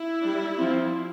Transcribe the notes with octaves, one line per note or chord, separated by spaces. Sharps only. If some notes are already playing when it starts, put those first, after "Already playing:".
Already playing: E4
G3 D4
F3 C4